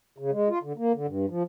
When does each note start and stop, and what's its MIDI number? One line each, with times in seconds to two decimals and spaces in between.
0.18 0.31 49
0.31 0.48 56
0.49 0.59 65
0.63 0.73 50
0.78 0.92 58
0.94 1.07 50
1.07 1.26 43
1.29 1.43 53